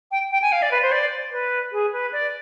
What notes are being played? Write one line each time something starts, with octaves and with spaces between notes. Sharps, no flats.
G5
G5
G#5
F5
D5
B4
C5
D5
B4
G#4
B4
D5